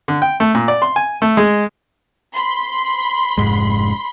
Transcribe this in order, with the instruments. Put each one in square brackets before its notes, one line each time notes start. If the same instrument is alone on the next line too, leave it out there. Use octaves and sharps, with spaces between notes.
[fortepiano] D3
G5
A3
A#2
D5
C6
G#5
A3
G#3
[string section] B5 C6
[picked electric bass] F1 G#2 G#3